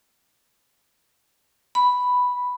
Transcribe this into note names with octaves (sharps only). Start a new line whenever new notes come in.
B5